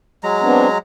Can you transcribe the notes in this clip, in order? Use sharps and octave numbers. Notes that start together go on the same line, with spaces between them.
F#3 G#3 A#5
B3 C4 D4